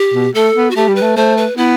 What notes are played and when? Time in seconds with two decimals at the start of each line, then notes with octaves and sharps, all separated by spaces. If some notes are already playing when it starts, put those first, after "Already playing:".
Already playing: G4
0.14 B2
0.35 A3 A4
0.56 B3
0.71 F#4
0.76 A3 G4
0.88 G3
0.96 B4
1.01 A3
1.17 A3 C5
1.38 B4
1.57 B3 E4